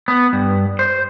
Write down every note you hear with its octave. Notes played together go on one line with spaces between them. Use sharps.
B3
G2
C5